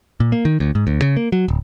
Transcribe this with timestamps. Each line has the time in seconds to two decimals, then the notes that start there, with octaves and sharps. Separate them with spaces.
0.20 A#2
0.32 A#3
0.45 D#3
0.60 D2
0.75 G#2
0.87 D2
1.02 C#3
1.17 A#3
1.32 F#3
1.48 D1